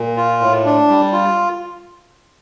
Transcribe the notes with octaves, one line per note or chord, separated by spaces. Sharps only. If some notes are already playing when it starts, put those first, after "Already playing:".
Already playing: A#2
F4
A2
D4
G3
F4